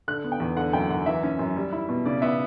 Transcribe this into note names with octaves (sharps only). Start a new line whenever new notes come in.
D3 F#6
B3
G5
E2
D3 F#5
F#2 G5
F#2 F#5
E3 E5
C#4
F#2
G3
E4
B2
C#3 D5
B3 E5